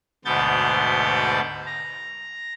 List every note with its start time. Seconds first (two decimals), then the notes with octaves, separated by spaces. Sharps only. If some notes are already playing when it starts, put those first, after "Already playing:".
0.25 D2 G#2 B2 B3 G6 A6
1.67 A#5